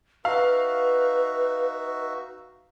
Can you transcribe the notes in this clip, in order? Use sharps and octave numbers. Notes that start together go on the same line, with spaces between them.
D#4 F#4 B4 E5 F5